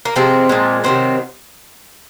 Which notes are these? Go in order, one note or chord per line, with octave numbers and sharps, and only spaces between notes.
A#3
C3 F3 G#3 C4
A#2 F3 G#3
C3 D#3 F#3 C4